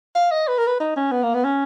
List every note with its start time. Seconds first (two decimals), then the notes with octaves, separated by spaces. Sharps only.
0.15 F5
0.31 D#5
0.48 B4
0.58 A#4
0.67 B4
0.80 D#4
0.96 C#4
1.12 B3
1.23 A#3
1.34 B3
1.44 C#4